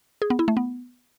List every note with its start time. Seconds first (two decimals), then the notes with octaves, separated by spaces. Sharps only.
0.22 G#4
0.30 B3
0.39 E4
0.48 A3
0.57 B3